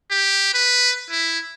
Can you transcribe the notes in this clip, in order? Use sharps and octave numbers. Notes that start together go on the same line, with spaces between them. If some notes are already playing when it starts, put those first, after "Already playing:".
G4
B4
E4